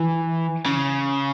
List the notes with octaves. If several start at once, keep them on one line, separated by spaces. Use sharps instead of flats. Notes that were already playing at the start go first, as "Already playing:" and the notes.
Already playing: E3
C#3